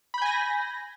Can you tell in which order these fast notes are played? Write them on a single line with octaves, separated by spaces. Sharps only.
B5 G6 G#5 A#6